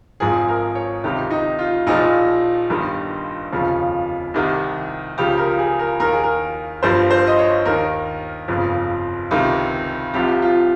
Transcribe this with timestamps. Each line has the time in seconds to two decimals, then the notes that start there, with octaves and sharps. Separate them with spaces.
0.20 G#1 G#2 F3 G#4
0.48 A#4
0.75 C#5
1.04 C#2 C3 D#3 G4
1.30 D#4
1.59 F4
1.87 A#1 A#2 F3 D#4
2.69 G1 G2 D#3
3.51 F1 D#2 C#3 F3
4.34 C2 C3 D#3
5.18 C#2 C#3 F3 G4
5.37 A#4
5.59 G#4
5.79 A#4
6.00 D#2 D#3 A#4
6.12 G#4
6.24 A#4
6.83 G1 G2 F3 C5
7.11 C5
7.27 D#5
7.39 C#5
7.65 D#2 D#3 A#4
8.48 G1 F2 C#3 F3
9.31 C#2 C3 D#3
10.14 C2 C3 F3 G4
10.42 F4